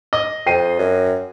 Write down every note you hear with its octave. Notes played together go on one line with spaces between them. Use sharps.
D#5
F2 G5 C7 D#7
F#2